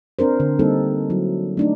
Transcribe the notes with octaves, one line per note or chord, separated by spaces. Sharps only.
C4 D4 A#4 C5
D3
G3 A#3 C4 D#4 A4
F#3 E4
A3 D4 D#4